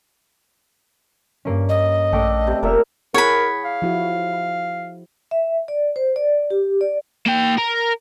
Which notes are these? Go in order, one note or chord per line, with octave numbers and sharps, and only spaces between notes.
G2 A#3 C#4
D#5
A#1 A3 D4 A4 G5 D6
C3
F1 A#2 A4 A#4 E5 F6
E4 G#4 A#4 C#5 F#5 B5
F5
F3 E4 F#4
E5
D5
C5
D5
G4
D5
A#3 G5
A#4